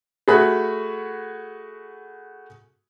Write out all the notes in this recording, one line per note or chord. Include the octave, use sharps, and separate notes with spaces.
A3 F#4 G#4 B5 F#6